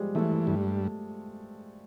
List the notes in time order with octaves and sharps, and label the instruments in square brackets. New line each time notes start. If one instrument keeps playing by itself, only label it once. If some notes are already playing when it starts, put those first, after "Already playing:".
Already playing: [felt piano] F3 G3 G#3
[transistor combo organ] E3 [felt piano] A3
[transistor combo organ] G2